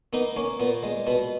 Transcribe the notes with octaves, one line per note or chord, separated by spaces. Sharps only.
A#3 B3 D#4
A#3 C#4
A#2 B3
G#3
B2 B3